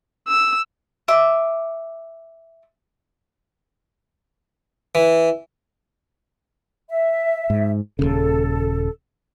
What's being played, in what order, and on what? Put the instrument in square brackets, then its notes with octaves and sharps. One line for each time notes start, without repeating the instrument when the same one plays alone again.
[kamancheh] E6
[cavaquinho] E5 D6
[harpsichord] E3
[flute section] E5
[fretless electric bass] G#2
[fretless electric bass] D#1 A#1 C#3 [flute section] A4